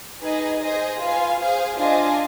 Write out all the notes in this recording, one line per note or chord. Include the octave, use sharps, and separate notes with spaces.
D#4 G#4 B4 D#5 G#5
G#4 C5 D#5
F4 B4 F5 G#5
G#4 C5 F5 G#5
D4 F4 C5 D#5 G#5